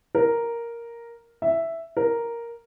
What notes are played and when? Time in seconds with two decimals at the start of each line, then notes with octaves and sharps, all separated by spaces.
0.15 A#4
1.42 E5
1.97 A#4